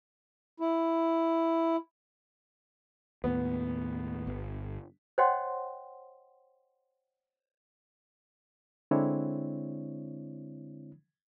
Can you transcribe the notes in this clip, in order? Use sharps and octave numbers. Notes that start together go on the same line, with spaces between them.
E4
D#2 A2 B3
G1
C5 C#5 D#5 F#5 G5 C6
D3 G#3 C4 D4 E4 C#5